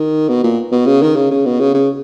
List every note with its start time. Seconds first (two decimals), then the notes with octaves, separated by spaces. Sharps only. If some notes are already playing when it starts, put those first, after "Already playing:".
Already playing: D#3
0.29 B2
0.43 A#2
0.72 B2
0.86 C#3
1.02 D#3
1.15 C#3
1.30 C#3
1.45 B2
1.60 C#3
1.74 C#3